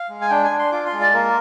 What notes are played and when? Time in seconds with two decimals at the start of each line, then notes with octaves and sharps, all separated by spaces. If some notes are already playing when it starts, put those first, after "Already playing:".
Already playing: F5
0.09 G#3
0.21 G#5
0.30 D4 G5
0.44 G#5
0.51 D4
0.59 C6
0.72 F4 D6
0.86 C6
0.93 G#3
1.00 D5
1.14 A#3 A#4